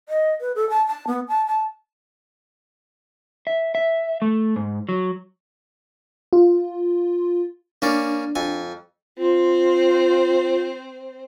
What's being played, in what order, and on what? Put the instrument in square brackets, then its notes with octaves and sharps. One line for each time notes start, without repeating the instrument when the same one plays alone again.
[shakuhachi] D#5
B4
A4
A5
A5
B3
A5
A5
[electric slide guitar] E5
E5
A3
G#2
F#3
[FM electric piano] F4
[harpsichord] A#3 C#4 D5 [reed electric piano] D4
[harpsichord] F2 G#5
[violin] C4 C5 [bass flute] F4